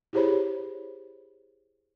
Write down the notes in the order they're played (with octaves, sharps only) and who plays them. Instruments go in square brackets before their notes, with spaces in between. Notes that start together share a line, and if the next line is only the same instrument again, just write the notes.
[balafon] E4 G4 G#4 C5 C#5 B5